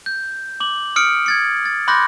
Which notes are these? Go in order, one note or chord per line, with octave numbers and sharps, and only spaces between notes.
G6
D6 F#7
D#6 F6 C#7 D7
G#6 A6 C#7
A6
B5 C6 D6 F#6 G6 A#6